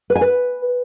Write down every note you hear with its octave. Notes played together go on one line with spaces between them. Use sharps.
B4
G#5
B4